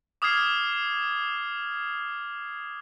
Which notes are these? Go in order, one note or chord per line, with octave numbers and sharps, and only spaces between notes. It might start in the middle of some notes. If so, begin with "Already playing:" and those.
D6 D#6 F6 G#6 C7